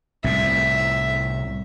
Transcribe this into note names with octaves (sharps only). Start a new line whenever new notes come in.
C2 A2 C3 E5